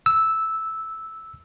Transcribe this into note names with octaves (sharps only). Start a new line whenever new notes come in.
E6